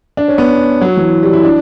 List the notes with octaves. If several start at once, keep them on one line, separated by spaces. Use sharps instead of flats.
D4
C#4
B3
F#3
E3
G3
E4
D4